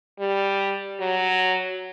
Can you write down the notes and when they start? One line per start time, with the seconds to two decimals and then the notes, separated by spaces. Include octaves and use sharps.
0.19 G3
1.00 F#3